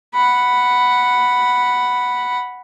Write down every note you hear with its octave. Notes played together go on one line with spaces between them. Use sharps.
F#5 B5